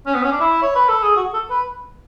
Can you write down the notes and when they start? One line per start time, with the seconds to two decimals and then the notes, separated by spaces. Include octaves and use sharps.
0.06 C#4
0.14 B3
0.23 C#4
0.32 D4
0.40 E4
0.62 C#5
0.75 B4
0.88 A4
1.03 G#4
1.16 F#4
1.34 A4
1.50 B4